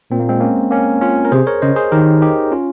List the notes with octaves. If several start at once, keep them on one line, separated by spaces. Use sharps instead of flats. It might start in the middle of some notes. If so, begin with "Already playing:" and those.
A#2 C4
A#3
G#3 C4
A#3 C#4
A#3 C#4
C#4 F4
A#4
C3 G#4 C5
A#4 C#5
C#3 C5 D#5
G#4 C5
D#3 G4 A#4
D#4 G4
C#4 F4